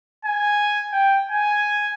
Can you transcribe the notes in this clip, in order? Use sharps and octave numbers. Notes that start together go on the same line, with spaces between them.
G#5
G5
G#5